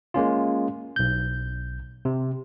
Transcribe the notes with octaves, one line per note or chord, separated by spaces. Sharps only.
G#3 A#3 C#4 F4
B1 G6
C3